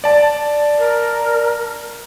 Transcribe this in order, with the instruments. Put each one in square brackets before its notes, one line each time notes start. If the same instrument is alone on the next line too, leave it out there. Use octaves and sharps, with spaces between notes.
[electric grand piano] D5 A5
[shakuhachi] A#4